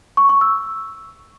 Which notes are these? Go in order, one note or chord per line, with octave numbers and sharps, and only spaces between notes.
C#6
C#6
E6